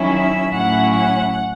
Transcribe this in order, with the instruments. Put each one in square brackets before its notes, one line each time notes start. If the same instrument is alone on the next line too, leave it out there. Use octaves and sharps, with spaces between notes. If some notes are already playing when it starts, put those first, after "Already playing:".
Already playing: [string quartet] D#3 F#3 C#4 E4
E5
A2 F#3 C#4 E4 F#5
F#5